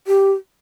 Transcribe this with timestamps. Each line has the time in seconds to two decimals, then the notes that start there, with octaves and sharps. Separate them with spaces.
0.07 G4